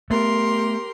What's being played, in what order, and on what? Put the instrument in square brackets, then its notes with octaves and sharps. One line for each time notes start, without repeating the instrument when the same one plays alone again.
[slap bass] A3 B3 [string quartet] G4 A#4 C6